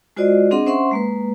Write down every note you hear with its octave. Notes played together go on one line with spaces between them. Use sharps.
G#3 F4 F#4 C5 D5 D#5
C4 D4 G#4 D#5 F#5 C6
C#4 C5 E5 F#5 C6 C#6
G#3 A#3 B4